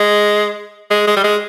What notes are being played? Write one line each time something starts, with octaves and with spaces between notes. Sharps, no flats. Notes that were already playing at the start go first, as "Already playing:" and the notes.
Already playing: G#3
G#3
G#3
G3
G#3